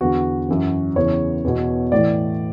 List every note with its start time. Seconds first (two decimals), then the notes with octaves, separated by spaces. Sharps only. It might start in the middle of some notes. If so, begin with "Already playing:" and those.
0.01 E2 D3 F#4
0.49 F#2 E3
0.96 E2 C#3 E3 C#5
1.44 E2 B2
1.92 A2 E3 D5